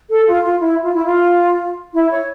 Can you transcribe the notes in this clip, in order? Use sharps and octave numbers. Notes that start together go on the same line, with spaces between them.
A4
F4
F4
E4
F4
E4
F4
E4
C#5